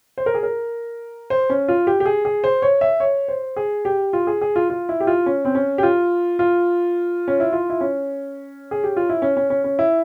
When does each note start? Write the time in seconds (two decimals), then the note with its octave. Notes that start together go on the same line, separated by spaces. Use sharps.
0.18 C5
0.26 A#4
0.34 G#4
0.43 A#4
1.30 C5
1.50 C#4
1.68 F4
1.87 G4
2.00 G4
2.05 G#4
2.25 G#4
2.44 C5
2.62 C#5
2.81 E5
3.00 C#5
3.28 C5
3.56 G#4
3.85 G4
4.13 F4
4.27 G#4
4.41 G#4
4.56 F4
4.70 F4
4.89 E4
5.00 G4
5.07 F4
5.26 C#4
5.45 C4
5.55 C#4
5.78 G4
5.83 F4
6.39 F4
7.28 C#4
7.40 E4
7.52 F4
7.70 E4
7.81 C#4
8.71 G#4
8.84 G4
8.97 F4
9.09 E4
9.22 C#4
9.37 C#4
9.50 C#4
9.64 C#4
9.79 E4